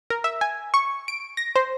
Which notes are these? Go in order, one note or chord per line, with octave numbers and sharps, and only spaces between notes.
A#4
E5
G#5
C#6
D7
A#6
C5